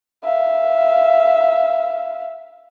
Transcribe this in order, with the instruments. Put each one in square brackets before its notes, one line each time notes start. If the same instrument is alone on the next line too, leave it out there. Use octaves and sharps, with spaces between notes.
[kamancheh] E5 F5